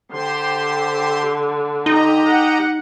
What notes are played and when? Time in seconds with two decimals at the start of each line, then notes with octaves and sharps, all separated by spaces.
0.12 D3 G4 C5 C6
1.86 D#4 G4 D#5 A#5
2.27 F#5